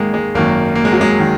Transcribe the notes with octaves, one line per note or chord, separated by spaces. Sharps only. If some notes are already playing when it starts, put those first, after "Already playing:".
Already playing: G#1 G#2 D#3 G#3 A#3 A#4
G#3
G#1 F#2 D#3 A#3
A#3
G#3
F#3
G#3
D#3